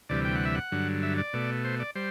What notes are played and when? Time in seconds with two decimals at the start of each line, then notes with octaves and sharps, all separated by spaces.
0.09 D2 C3 E3 G3 D5
0.25 G5
0.36 F#5
0.45 E5
0.55 F#5
0.72 G2 D3 F#3
1.03 E5
1.18 D5
1.33 B2 A3
1.64 C5
1.80 D5
1.95 G3 C5